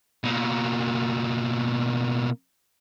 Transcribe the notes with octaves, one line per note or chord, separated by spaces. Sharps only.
B2 A#3